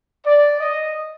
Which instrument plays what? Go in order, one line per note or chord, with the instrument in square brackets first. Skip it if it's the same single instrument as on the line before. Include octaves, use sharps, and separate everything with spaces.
[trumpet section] D5
D#5